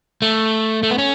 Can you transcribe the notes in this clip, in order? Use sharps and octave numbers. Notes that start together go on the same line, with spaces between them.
A3
A3
B3
C#4